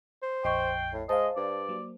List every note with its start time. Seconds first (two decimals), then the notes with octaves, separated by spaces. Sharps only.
0.22 C5
0.44 A#1 F2 D#5 G5 C#6 C7
0.93 A2
1.09 G#3 C5 D#5 F5 A5
1.36 G2 D5
1.69 F#3 A#3